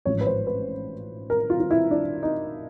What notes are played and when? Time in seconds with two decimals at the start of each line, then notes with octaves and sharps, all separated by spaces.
0.05 A1 G#2 F3 C#5
0.21 B4
0.27 C5
0.47 B4
1.30 A#4
1.50 F4
1.60 F4
1.71 E4
1.91 D4
2.23 D#4